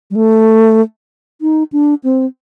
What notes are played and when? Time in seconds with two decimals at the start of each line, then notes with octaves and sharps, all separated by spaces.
0.11 G3
0.15 A3
1.41 D#4
1.72 D4
2.04 C4